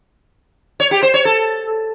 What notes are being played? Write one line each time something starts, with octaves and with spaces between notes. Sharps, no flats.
C#5
G4
C5
C#5
A4